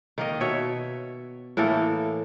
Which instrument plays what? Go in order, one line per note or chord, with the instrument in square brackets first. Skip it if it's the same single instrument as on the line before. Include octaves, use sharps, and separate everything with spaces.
[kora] D#3 A#3 D#5
B2 C#5 E5
A2 E3 A#3 A4